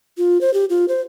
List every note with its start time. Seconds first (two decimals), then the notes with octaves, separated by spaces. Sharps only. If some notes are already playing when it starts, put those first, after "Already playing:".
0.18 F4
0.41 C5
0.54 G4
0.70 F4
0.88 C5